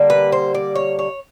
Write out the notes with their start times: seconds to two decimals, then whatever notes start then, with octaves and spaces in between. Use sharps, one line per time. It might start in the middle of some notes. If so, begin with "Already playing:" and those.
Already playing: D3 G3 A#3
0.10 B4
0.32 C5
0.55 D5
0.75 C#5
0.99 C#5